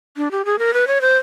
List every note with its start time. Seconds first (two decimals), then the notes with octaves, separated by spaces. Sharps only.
0.17 D4
0.31 G4
0.45 G#4
0.59 A#4
0.74 B4
0.87 C#5
1.01 C5